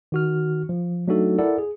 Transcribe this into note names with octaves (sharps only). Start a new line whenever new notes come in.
D#3 F#4 F6
F3
F#3 A3 D4 D#4 F#4 A4
E4 A4 A#4 D5 F#5
G#4